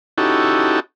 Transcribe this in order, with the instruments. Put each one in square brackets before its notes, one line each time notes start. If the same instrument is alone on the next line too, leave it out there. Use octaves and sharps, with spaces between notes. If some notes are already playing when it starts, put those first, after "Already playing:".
[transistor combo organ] C#4 D#4 E4 F#4 G4 A4